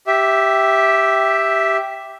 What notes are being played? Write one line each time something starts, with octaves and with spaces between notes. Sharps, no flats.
G4 E5